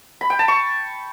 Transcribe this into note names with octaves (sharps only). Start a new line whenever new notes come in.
B5
G5
A5
C#6